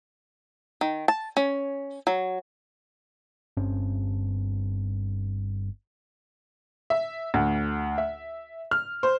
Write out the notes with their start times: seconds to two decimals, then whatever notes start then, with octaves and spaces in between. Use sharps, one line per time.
0.81 D#3
1.08 A5
1.37 C#4
2.07 F#3
3.57 G1 G2 C4 C#4
6.90 E5
7.34 D2
7.98 E5
8.71 F6
9.03 C5